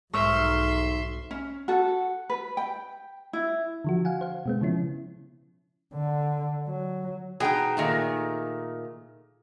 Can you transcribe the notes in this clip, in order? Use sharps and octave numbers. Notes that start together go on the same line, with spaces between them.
B1 G#2 E5 C6 C#6 E6 F6
C#4
F#4 A4
B4
G5
E4
D3 F3 F#4
F5 F#5 G#5
C5 F5
B2 G#3 B3
C#3 F3 C#4 E4
D3
F#3
B2 D#4 G#4 G5
A#2 D#3 A3